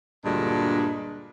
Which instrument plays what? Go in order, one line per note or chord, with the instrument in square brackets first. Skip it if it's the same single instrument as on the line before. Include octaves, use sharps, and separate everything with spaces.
[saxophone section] D2 G2 A#2 G#3 D4